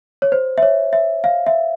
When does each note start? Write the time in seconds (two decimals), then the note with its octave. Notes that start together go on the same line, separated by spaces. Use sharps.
0.22 C#5
0.32 C5
0.58 E5
0.63 C#5
0.93 E5
1.24 F5
1.47 E5